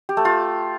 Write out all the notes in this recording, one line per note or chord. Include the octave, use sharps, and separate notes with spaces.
G4
A3
F4